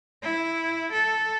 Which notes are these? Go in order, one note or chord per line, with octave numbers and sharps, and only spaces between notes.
E4
A4